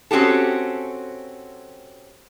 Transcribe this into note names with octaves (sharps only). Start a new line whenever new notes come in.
C4 C#4 F#4 G4 A4